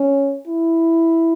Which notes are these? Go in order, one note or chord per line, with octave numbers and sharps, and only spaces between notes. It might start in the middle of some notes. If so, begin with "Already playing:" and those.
Already playing: C#4
E4